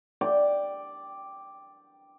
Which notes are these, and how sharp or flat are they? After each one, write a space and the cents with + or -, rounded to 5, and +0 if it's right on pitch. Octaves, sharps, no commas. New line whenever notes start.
D5 +0 G5 +0